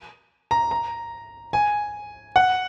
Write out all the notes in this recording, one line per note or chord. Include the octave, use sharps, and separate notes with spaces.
A#5
A#5
G#5
F#5